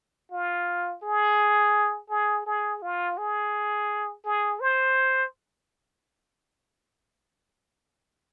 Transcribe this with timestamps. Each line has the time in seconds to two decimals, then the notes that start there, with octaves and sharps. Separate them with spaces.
0.32 F4
1.03 G#4
2.10 G#4
2.46 G#4
2.82 F4
3.18 G#4
4.25 G#4
4.60 C5